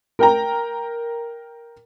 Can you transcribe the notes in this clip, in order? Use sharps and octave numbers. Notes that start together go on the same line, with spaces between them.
A#4 G5 A#5